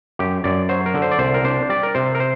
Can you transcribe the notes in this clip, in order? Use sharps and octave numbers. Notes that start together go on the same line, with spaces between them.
F#2 G4
F#2 D5
F#3 C5
A#4
D3
C5
D5
C2 C5
A#4
D4 C5
G3 D5
A#4
C3 C5
A#4
C5